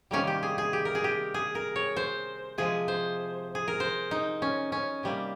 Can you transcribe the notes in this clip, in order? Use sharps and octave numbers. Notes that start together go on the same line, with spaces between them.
C3 D#3 G3 A#3 C#4
G4
G#4
G#4
G4
A#4
G#4
G4
G#4
A#4
C#5
C5
C3 F3 G#3 G#4
C5
G#4
A#4
C5
D#4
C#4
C#4
C3 G3 A#3